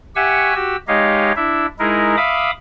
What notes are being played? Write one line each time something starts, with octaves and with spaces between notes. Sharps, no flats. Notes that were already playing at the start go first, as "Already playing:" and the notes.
G4 E5 F#5 G#5 C#6 E6
F#4 G4 E6
G#3 D#4 G4 C#5 D#5 F5
D4 E4 E5
G#3 D#4 E4 G#4 A#4
E5 F5 B5 D6 D#6